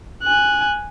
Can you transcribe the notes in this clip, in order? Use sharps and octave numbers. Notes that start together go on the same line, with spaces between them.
G#5 F#6